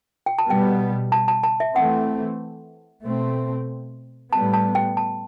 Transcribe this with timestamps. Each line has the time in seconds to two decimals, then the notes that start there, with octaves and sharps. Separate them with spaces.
0.26 G5
0.39 A5
0.48 B2 G3 B3 G5
1.12 A5
1.28 A5
1.43 A5
1.60 E5
1.76 E3 A3 C4 F#5
3.04 B2 A3 C4
4.33 A2 G3 B3 A5
4.53 A5
4.75 G5
4.97 A5